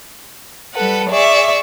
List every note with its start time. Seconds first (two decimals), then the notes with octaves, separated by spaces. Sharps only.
0.74 G3 A4 B4 F#5
1.09 G#4 D5 E5 C#6